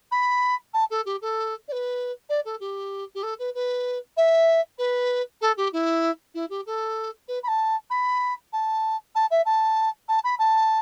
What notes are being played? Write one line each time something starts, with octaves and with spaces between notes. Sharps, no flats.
B5
A5
A4
G4
A4
D5
B4
D5
A4
G4
G4
A4
B4
B4
E5
B4
A4
G4
E4
E4
G4
A4
B4
B5
A5
B5
A5
A5
E5
A5
A5
B5
A5